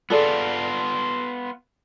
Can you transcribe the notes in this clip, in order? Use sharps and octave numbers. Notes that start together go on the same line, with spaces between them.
B3 F4 G#4 A4 D5